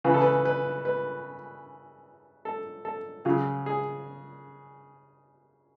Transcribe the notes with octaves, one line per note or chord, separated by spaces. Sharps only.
C#3 E3 B4
A4
B4
B4
B4
A4
A4
C#3 F#3 G#4
G#4